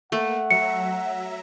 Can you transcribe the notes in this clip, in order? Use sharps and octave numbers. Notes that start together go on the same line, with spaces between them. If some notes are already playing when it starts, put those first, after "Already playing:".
A3 A#3 F#5
F#3 E5 A#5 C#7